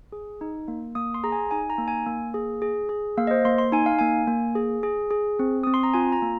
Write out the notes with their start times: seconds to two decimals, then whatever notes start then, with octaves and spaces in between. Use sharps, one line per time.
0.12 G#4
0.41 D#4
0.68 A#3
0.95 A#3 D#6
1.14 C6
1.24 G#4 A#5
1.32 G#5
1.51 D#4 G#5
1.70 A#5
1.78 A#3
1.88 G#5
2.06 A#3
2.34 G#4
2.62 G#4
2.89 G#4
3.17 A#3 F5
3.27 D#5
3.31 C5
3.45 A#3 C6
3.58 C6
3.72 D#4 G#5
3.86 F5
3.99 A#3 G#5
4.28 A#3
4.55 G#4
4.83 G#4
5.11 G#4
5.39 C4
5.63 C4 D#6
5.74 C6
5.83 A#5
5.94 F4 G#5
6.12 A#5
6.22 A#3